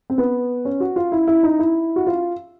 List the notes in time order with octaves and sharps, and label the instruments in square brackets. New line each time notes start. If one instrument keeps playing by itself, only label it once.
[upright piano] C4
B3
C#4
F#4
F4
E4
E4
D#4
E4
F#4
F4